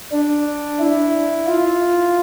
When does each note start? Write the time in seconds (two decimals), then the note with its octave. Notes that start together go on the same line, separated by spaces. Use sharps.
0.12 D4
0.80 E4
1.47 F4